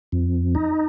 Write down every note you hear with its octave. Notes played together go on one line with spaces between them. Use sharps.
F2
D#4